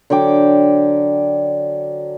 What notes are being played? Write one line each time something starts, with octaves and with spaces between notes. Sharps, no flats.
D3 F#3 G5 D6